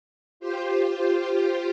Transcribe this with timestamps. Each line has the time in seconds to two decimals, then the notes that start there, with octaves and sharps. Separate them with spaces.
0.40 F4 G4 C5